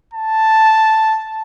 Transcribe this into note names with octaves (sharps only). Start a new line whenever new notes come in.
A5